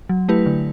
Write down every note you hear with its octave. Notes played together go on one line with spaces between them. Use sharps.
F#3
A3 E4 G4 B4
D3